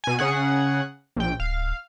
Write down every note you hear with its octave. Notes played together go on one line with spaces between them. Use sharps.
B2 G#5
C#3 G#4 F#5
A#1 G5
D1 F5